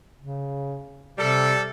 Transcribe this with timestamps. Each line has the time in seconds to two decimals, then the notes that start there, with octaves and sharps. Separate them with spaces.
0.19 C#3
1.18 C3 G3 A4